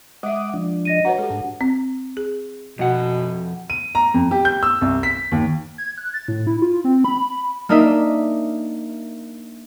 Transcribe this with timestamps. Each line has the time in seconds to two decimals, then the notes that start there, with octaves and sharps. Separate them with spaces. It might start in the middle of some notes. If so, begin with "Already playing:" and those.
0.23 G#3 E5 F#5 D6 D#6
0.54 F3 D4
0.85 D#5 A#6 D#7
1.05 F#4 B4 C#5 F#5 A#5
1.18 G#3 G4 A4
1.31 G#2 D4
1.61 C4
2.17 G#4
2.79 F2 B2 F#5
3.70 D#7
3.95 A#5
4.14 F2
4.31 G4
4.45 G6
4.63 E6
4.81 C2
5.03 B6
5.32 D#2
5.78 G#6
5.98 F#6
6.14 A6
6.28 A2
6.47 E4
6.62 F4
6.84 C4
7.04 B5
7.69 A#3 D4 D#4 A#4 D#5 E5